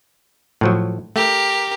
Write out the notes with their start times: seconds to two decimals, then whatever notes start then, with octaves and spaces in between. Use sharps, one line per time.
0.61 A2 F3 F#3
1.16 A3 G4 A#4